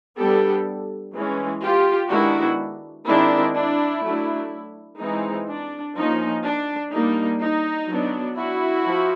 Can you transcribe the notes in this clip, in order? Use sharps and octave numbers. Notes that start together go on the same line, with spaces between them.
G3 B3 D4 G4 A4
E3 G#3 C#4
F4 G4
D#3 G#3 B3 D4 E4 F#4
D#3 G#3 C4 D4 E4
D4 E4
F#3 A3 D4
E3 G#3 C4 D#4
D4
F3 A#3 C#4 D#4
D4
G3 A#3 D4 D#4
D#4
F#3 B3 D4
E4 F#4
F3